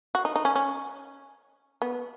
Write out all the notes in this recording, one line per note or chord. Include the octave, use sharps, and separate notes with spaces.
F#4
D#4
D#4
C#4
C#4
B3